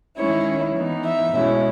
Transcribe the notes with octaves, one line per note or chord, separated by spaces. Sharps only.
D#3 G#3 C#4 E4 C#5
E3 B3 D#4
E5
B2 G#3 C#4 E4